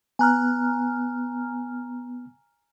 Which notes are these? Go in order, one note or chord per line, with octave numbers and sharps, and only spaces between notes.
B3 G#5 A#5 F6 F#6